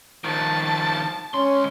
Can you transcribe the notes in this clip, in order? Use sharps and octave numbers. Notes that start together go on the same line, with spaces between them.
D#3 F3 A5
C#2 C#4 C6